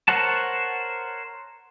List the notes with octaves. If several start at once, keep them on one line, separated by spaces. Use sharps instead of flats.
A#4 C5 C#5 F#5 A5